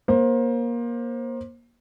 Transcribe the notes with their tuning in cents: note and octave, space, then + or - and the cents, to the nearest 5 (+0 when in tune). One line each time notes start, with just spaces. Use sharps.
A#3 +25 C5 +25